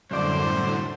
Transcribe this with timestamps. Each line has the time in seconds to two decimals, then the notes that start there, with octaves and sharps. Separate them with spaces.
0.11 C2 F#2 A2 D3 C5 D5